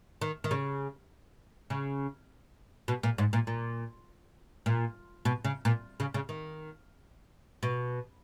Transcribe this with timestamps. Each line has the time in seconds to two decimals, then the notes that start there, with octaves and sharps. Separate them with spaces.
0.21 D#3
0.44 D#3
0.51 C#3
1.70 C#3
2.88 B2
3.03 A#2
3.18 G#2
3.33 A#2
3.47 A#2
4.66 A#2
5.25 B2
5.45 C#3
5.65 A#2
6.00 C#3
6.14 C#3
6.29 D#3
7.63 B2